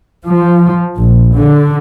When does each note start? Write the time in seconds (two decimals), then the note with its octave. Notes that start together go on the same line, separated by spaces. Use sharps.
0.25 F3
0.97 A#1
1.34 D3